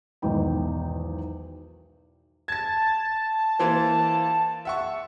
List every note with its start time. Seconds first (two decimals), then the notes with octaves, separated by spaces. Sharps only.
0.22 B1 E2 G#2 D#3 D#4 G5
2.48 A5 G#6 A6
3.59 E3 A#3 C5
4.65 E5 F#5 C#6